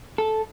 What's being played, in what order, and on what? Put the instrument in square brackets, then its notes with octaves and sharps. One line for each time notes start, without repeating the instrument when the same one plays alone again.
[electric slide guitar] A4